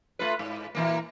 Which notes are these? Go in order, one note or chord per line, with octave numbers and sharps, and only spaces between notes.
A3 F4 B4
G#2
A#2 E3 A#3